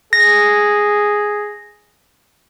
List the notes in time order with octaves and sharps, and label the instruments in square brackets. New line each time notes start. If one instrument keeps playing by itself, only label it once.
[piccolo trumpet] G#4 [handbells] A#6